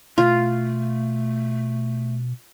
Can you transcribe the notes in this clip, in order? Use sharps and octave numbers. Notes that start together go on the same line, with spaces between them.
B2 A3 F4